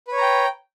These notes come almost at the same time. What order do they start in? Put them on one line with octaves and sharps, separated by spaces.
B4 C#5 A#5 G5